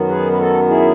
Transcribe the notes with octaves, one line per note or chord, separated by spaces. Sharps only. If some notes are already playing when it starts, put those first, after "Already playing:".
Already playing: F#2 D#3 F#3 B3
G#4 B4
B4
F#4 A4
E4 G#4